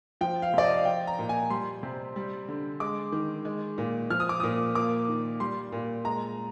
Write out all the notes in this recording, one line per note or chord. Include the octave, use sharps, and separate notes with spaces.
F3 G5
F5
C3 D5
D#5
F5
F3 G5
A#5
A#2
G#5
G3 C6
C3
G3
D3
G#3 D6
D#3
G#3
A#2
F3 F6
D#6
D6
A#2 D#6
A#3 D6
D#3
G3 C6
A#2
G#3 A#5